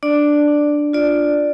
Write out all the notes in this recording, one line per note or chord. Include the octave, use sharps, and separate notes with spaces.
D4 D5
D4
F4 D5